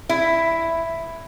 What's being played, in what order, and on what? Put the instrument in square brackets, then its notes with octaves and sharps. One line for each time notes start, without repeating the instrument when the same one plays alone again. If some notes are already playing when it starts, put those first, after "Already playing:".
[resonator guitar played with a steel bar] E4